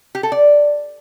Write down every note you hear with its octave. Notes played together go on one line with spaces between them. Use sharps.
G4
A4
D5